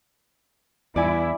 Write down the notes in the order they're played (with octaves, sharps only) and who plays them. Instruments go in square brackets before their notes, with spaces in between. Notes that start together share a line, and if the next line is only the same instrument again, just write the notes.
[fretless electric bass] E2 [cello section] G2 E4 [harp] D5 G#5 D6